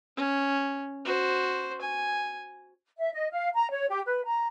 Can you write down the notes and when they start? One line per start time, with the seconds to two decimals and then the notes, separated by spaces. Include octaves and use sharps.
0.17 C#4
1.05 F#4 C5
1.81 G#5
2.98 E5
3.13 D#5
3.32 F5
3.54 A#5
3.71 C#5
3.89 G4
4.06 B4
4.23 A#5